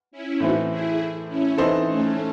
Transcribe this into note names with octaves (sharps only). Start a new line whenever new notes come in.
C#4 E4
A2 E3 C4 D#4 F#4
E4 G#4
C#4 E4
E3 C4 D#4 A4 C5
A3 C#4